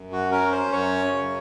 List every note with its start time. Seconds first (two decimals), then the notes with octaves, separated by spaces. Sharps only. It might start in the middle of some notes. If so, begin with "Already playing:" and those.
Already playing: F#2
0.12 F#4
0.31 C#4 A#4
0.52 C5
0.72 F#2 C#5
1.12 C#3